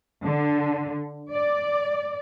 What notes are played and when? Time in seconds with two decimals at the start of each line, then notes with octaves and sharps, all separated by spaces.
0.24 D3
1.31 D5